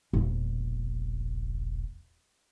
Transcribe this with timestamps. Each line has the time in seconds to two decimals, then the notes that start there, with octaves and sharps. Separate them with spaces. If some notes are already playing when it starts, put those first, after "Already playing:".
0.13 E1 A#1